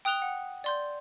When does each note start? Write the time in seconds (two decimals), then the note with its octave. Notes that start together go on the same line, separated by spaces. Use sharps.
0.05 G5 D#6 F#6 F7 G7
0.22 F#5
0.64 D5 C6 G6